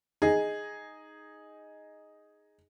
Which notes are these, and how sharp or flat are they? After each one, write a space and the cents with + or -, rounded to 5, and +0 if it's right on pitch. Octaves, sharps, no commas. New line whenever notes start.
D#4 +0 G#4 +0 D#5 +0